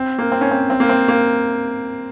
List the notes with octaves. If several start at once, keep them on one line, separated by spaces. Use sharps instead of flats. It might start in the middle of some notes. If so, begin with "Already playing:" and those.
Already playing: C4
A#3
C4
C#4
C4
C4
A#3
C4
A#3